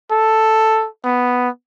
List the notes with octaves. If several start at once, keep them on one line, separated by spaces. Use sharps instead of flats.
A4
B3